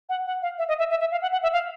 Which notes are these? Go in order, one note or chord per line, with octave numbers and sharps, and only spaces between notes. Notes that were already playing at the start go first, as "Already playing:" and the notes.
F#5
F#5
F5
E5
D#5
E5
E5
E5
F5
F#5
F#5
E5
F5